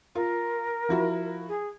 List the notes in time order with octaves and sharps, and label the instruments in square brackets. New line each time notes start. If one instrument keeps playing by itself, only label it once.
[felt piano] F4 [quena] A#4
[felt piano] F3 E4 F#4
[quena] G#4